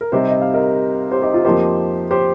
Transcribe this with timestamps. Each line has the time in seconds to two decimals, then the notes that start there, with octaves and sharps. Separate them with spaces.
0.01 A#4
0.12 C3 G3 C4 D#4 G4 C5
0.29 D#5
0.42 F5
0.54 A#4 D#5
1.11 G4 C5
1.22 D#4 G4
1.34 F4
1.45 F2 F3 A#3 D#4 G4 C5
2.11 G4 C5